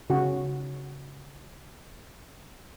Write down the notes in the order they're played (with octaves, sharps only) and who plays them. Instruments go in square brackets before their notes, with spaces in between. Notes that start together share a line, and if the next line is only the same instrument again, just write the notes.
[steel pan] C#3 F#4